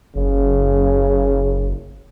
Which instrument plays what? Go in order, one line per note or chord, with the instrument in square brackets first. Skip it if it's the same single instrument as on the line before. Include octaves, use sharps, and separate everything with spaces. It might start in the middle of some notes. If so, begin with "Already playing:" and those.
[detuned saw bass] F#1 [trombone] C#3